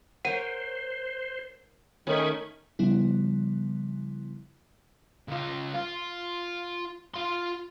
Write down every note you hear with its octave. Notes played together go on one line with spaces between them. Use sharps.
A#4 C5 C#5 F#5 D#7
D#3 A3 C#4 G#5 B5 C#6
C#3 F3 G3 B3 E4
C#2 F4
F4
F4 C6